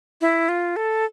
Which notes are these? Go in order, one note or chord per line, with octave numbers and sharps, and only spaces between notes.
E4
F4
A4